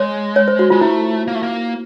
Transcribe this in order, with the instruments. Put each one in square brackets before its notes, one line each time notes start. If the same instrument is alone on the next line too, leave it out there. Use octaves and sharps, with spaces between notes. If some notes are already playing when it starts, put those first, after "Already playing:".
Already playing: [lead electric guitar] G#3 [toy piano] C#5
[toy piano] C#5
C5
F#4
[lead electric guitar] G#3 [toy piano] F4
[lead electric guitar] A3 [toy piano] E4
[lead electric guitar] A#3
A3
A#3